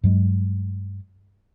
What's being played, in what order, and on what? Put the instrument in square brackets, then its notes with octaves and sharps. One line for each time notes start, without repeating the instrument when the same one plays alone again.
[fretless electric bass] G2 F#3 G#3